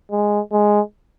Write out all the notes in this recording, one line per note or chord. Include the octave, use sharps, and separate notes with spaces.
G#3
G#3